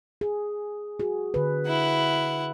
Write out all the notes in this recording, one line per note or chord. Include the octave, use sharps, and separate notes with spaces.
G#4
F#4 G#4
D3 B4
E4 F#5